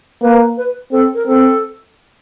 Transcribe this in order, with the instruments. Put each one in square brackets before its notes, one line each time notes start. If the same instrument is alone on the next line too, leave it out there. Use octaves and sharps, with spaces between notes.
[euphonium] A#3 [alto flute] B4
[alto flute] B4
[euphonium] C4 [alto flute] A4
[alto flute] A#4
[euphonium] C4 [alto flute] A4